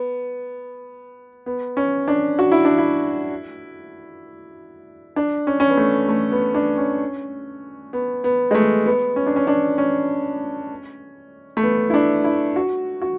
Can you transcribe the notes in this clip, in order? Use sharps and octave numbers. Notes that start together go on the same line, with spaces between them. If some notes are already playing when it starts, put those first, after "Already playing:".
Already playing: B3
B3
C#4
D4
F#4
E4
D4
E4
D4
C#4
C#4
B3
A3
A3
B3
D4
C#4
B3
B3
G#3
A3
B3
C#4
D4
C#4
D4
C#4
A3
B3
E4
D4
E4
F#4
F#4